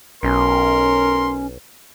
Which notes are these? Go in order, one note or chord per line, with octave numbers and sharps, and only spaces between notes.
B1 C#4 A#4 C6